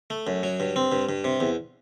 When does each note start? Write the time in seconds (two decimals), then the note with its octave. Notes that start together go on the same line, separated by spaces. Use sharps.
0.10 A3
0.27 F#2
0.43 F#3
0.60 G2
0.76 C4
0.92 G2
1.09 G2
1.24 C3
1.40 E2